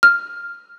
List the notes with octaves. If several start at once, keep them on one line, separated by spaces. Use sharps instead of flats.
F6